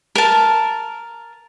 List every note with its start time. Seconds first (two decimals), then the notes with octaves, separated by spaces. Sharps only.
0.15 A#4 A5